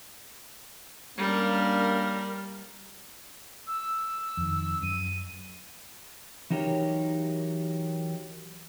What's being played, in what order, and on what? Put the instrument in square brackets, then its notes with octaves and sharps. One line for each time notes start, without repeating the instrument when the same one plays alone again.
[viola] G3 A#4 [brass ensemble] A#3 C#4 D4
[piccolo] E6
[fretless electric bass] F2 D#3
[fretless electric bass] F#2 [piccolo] D#7
[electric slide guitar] E3 F#3 D#4 G4 A#4 C#5